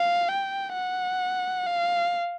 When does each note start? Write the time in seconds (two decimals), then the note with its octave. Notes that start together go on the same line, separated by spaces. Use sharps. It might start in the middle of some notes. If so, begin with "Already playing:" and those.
Already playing: F5
0.28 G5
0.73 F#5
1.66 F5